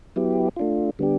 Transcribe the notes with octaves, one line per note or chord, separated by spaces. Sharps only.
F#3 B3 E4 G4
A3 D4 F4
D3 G3 B3 D4 G4